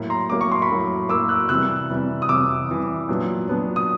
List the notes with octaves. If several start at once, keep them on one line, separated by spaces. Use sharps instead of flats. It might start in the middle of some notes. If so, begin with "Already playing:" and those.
Already playing: A2 F#3 A#3
A#5 C6
A2 F#3 A#3 D6
C#6
C6
B5 C#6
A2 F#3 A#3
A2 F#3 A#3 D6 E6
E6 F#6
C3 E3 G3 E6 F#6
C3 E3 G3
D#6
C3 E3 G3 D6 E6
C3 E3 G3
A#2 F#3 B3 D4
A#2 F#3 B3 D4
D#6